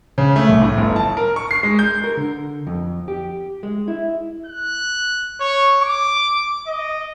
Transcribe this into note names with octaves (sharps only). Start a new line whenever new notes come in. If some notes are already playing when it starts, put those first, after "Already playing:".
C#3
A3
C2
A2
G1
A5
A#4
C#6
C7
G#3
G6
A#4
D3
F2
G4
G#3
E4
F#6
C#5
D6
D#5